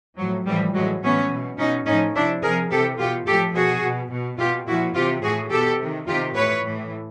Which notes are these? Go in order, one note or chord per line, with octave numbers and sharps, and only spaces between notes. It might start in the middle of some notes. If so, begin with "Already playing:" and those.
A2 F3 F#3
A2 E3 F3 G3
A2 E3 F#3 G#3
A2 E3 B3 C#4
B2
B2 C#4 D#4
A2 F3 C#4 D#4
C3 F3 D4 E4
C3 F3 G#4 A#4
C3 E3 G4 A4
B2 F4 G4
A2 F3 G4 A4
B2 F#4 G#4
B2
B2
B2 F4 G4
A#2 F3 E4 F#4
C3 E3 F4 G4
A2 E3 F#4 G#4
B2 G4 A4
C3 D#3
C3 D#3 F4 G4
A2 E3 B4 C#5
A2 E3